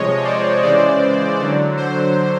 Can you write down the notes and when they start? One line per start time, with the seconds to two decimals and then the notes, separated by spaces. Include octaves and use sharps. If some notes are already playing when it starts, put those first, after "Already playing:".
Already playing: C3 F3 G#3 C#5 D#5
0.24 C5 D5
0.63 C#3 E3 G#3 C5 D5
1.39 D3 F#3
1.77 C5